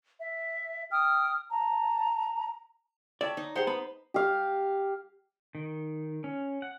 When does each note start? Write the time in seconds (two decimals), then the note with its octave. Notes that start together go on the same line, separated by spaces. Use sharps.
0.21 E5
0.92 G5 D#6 F6
1.50 A5 A#5
3.21 C#5 D5 E5 G5 A5
3.37 D#4
3.55 G4 G#4 C5 F#5 C6
3.67 B3 B5
4.14 G4 F5
5.55 D#3
6.24 C#4
6.62 F#5